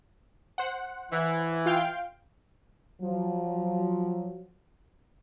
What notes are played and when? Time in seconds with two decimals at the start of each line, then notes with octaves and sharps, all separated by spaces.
0.58 C5 F#5
1.12 E3
1.66 F4 F5 G5
3.02 F3 F#3